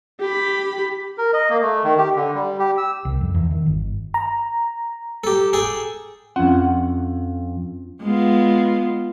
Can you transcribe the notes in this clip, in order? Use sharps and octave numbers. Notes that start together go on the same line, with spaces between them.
G4 B5
A#4
D#5
A#3
A3
D#3
G4
D3
G3
G4
E6
C2
F2
E2
D#3
G1
A#5
G4 A4
G#4 A4 G5
F2 C4 C#4 F4 F#5
G#3 B3 F4